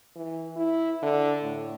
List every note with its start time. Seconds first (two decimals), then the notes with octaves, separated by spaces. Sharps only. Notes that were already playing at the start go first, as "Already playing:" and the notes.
0.16 E3
0.56 E4
1.02 D3
1.42 A2